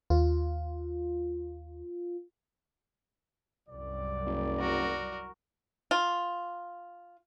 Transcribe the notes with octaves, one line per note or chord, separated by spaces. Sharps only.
D#2 F4
C2 F#2 D5
F#1
F#4 A#4
F4